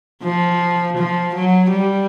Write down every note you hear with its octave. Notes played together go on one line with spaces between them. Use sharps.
F3
F3
F#3
G3